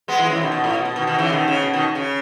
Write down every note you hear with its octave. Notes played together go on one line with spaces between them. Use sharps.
G#3 B3
E3 G#3
C#3 E3
B2 D#3
B2
A2
B2
B2
B2 D#3
B2 D#3
C#3 E3
B2 D#3
C#3
B2
B2 D#3
C#3